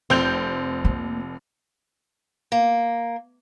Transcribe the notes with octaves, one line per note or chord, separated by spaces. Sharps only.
F1 C4 G6 F7
A#3
A#3